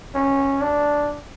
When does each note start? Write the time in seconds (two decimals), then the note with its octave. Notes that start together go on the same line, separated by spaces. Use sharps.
0.15 C#4
0.61 D4